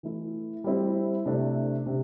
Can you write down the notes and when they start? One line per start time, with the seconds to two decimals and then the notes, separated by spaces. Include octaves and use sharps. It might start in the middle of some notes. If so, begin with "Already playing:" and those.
0.03 E3 A3 E4
0.64 G3 C4 E4
1.26 C3 A3 D4
1.86 C3